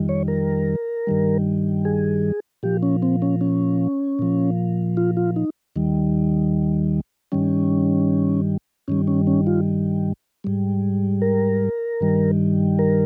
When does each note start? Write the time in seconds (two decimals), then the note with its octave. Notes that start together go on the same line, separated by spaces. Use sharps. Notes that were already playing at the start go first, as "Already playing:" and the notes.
Already playing: F2 D#3 G3
0.09 C#5
0.28 A#4
1.07 G2 D#3 G3
1.85 G#4
2.63 A#2 F3 G4
2.83 C#4
3.02 C4
3.22 C#4
3.41 C#4
4.19 A#2 F3
4.97 F4
5.17 F4
5.36 D#4
5.76 D#2 D#3 G3
7.32 G2 D#3 G3 C#4
8.88 G2 D#3 G3 C#4
9.07 C#4
9.27 C#4
9.47 F4
10.44 G#2 G3
11.22 A#4
12.00 G2 D#3 G3
12.79 A#4